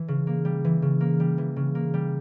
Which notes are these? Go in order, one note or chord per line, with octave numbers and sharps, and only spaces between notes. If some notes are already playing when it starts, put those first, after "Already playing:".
Already playing: E3
C#3
A#3
G3
E3
C#3
A#3
G3
E3
C#3
A#3
G3